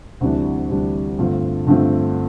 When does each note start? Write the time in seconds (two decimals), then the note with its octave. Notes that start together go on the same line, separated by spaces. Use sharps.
0.21 D2 C3 E3 G3 D4
0.70 D2 C3 E3 G3 D4
1.18 G2 D3 A3 C4 F4
1.67 G2 D3 A3 C4 F4